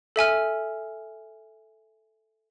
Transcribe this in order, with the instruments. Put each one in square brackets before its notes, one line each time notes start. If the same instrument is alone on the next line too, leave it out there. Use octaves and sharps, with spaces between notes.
[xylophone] A4 E5 G#5 F6